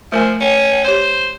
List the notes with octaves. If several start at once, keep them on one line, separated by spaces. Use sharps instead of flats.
F3 A3 A#4 G#5
C#4
G4 C5 C#5